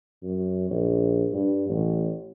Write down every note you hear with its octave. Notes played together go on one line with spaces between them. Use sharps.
F#2
A#1
G2
A1